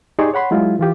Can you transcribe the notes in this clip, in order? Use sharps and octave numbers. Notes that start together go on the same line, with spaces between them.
D#4 G4 G#4 D5 C6 C#6
C#5 F#5 B5 C6
F#3 G#3 E4 F4
E3 F4 G4